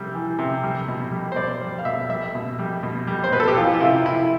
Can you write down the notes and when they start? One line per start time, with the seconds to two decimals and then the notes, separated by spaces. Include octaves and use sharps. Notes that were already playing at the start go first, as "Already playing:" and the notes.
Already playing: C3 G3
0.14 E3
0.39 C3
0.63 G3
0.88 B2
1.11 G3
1.32 C5
1.36 B2 D5
1.61 G3
1.79 F5
1.85 B2 E5
2.09 G3 E5
2.35 B2
2.59 G3
2.83 B2
3.07 G3
3.24 C5
3.32 B2 B4
3.40 A4
3.48 G4
3.57 E3 F4
3.73 F4
3.80 C3 E4
4.05 C3 E4